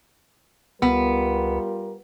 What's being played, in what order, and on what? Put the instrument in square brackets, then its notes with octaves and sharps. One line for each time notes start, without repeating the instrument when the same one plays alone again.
[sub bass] C#2 [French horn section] G3 F4 A#4 [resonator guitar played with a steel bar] B3